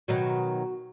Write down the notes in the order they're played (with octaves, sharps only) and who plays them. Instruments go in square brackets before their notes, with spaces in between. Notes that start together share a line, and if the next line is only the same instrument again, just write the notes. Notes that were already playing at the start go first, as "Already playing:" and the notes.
[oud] B2 D#3 F#3 [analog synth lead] F#4